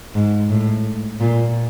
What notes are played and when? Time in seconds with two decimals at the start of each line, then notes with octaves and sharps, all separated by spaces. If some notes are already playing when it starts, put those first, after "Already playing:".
0.14 G#2
0.50 A2
1.20 A#2